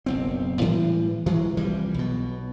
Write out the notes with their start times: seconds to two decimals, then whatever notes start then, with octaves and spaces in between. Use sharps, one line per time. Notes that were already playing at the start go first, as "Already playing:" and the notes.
0.06 F#1 B1 C4
0.61 A2 E3 G3 G#3
1.26 E3 F#3 G#3
1.57 C2 E3 F3 G3
1.94 B1 B2